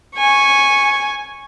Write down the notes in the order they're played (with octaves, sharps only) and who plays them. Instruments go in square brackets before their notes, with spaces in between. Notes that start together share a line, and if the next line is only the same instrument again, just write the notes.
[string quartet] G#5 C#6